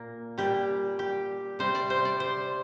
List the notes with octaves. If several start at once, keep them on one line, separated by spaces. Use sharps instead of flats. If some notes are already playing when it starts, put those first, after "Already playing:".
Already playing: A#2 A#3
A#2 G3 G4
G4
C3 G3 C5
D5
C5
D5
C5